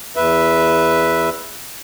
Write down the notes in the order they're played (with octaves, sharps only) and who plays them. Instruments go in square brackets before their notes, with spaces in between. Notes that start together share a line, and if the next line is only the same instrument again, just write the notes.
[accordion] E2 B4 E5